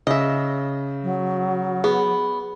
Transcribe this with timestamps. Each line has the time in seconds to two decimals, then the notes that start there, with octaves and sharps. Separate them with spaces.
0.07 C#3 D#5 E5
1.03 F#3
1.84 B3 G#4